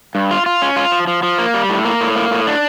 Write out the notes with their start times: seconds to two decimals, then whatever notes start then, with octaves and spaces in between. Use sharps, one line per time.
0.15 G2
0.31 F4
0.46 F4
0.62 C#4
0.76 F4
0.92 F3
1.07 F3
1.23 F3
1.38 A#3
1.54 G3
1.69 A2
1.85 A#3
2.01 A2
2.16 A#3
2.31 A2
2.47 D4